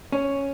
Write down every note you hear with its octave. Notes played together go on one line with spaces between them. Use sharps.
C#4